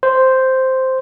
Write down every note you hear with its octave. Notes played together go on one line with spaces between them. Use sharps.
C5